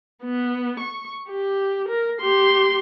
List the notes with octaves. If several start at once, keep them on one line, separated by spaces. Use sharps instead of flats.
B3
C#6
G4
A#4
G4 C6